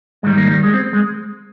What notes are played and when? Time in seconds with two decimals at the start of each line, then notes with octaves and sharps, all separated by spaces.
0.23 G#2 G#3
0.26 D#3 G3
0.37 A#3
0.51 G3
0.63 G#3
0.74 C4
0.93 G#3